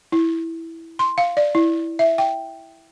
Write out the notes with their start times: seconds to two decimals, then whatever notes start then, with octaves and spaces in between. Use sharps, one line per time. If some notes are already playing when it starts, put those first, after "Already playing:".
0.12 E4
0.99 C6
1.18 F5
1.37 D5
1.55 E4
1.99 E5
2.18 G5